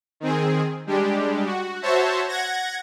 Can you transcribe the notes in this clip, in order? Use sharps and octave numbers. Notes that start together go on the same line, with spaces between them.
D#3 C4 G#4
G3 G#3 D4 G4
F#4
F#4 C5 C#5 E5 A5
F#5 G#6 A#6